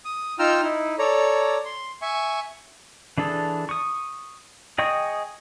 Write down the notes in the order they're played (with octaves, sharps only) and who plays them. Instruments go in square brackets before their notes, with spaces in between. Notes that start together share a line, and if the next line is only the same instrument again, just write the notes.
[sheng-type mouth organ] D#6
D#4 F4 G5 A#5 E6 F6
D#4 E4
A4 C#5 D5 A#5
C6
E5 G#5 C#6
[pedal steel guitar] E3 D4 G#4 A4
C#6 D#6
G#4 D#5 G5 C#6 D#6